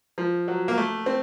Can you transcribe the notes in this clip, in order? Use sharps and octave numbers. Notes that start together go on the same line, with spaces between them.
F3
F#3
A#3
A3
C4